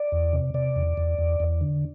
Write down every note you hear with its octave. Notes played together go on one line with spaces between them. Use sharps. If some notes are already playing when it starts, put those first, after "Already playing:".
Already playing: D5
E2
C3
C3 D5
E2
E2
E2
E2
D3